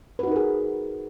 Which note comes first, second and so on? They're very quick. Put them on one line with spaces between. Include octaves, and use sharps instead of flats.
B4 F#4 D#4 A#4 G#4